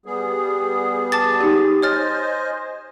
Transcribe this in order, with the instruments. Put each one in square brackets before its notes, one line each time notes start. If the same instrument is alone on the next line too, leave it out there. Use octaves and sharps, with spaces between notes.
[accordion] G3 B3 G#4
[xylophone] A5 D6 A6
[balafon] D#4 G4
[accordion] C5 D#5 G#5 [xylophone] C#5 F6 A6